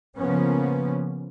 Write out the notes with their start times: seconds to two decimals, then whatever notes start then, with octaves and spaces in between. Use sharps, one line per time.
0.17 C#3 F3 A#3 B3 C#4